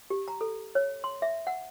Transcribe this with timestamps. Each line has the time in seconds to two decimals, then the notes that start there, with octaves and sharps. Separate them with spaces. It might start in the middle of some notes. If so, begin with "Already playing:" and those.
0.10 G4
0.28 A#5
0.41 A4
0.75 C#5
1.04 C6
1.22 E5
1.47 F#5